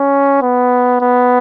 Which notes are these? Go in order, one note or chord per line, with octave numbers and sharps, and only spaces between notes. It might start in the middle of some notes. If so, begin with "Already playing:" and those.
Already playing: C#4
B3
B3